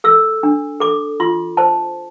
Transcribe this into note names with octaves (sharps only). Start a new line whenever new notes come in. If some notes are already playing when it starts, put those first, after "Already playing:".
A4 E6
D4
A4 D6
F4 C6
C5 A5